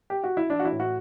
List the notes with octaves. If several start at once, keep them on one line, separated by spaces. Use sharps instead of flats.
G4
F#4
E4
E3 D4
F#4
E4
A2
F#4